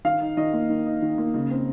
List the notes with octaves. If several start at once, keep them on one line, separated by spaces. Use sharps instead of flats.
D#3 F5
D#4
D#3 D#5
A#3
D#3
D#4
D#3
A#3
C#3
C4